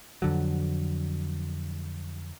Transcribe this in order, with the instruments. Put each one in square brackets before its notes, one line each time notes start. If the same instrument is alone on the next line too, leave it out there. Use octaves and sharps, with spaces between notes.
[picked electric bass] F2 D3 F#3